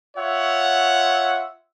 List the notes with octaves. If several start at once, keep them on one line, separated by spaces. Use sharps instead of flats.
F4 C#5 E5 F#5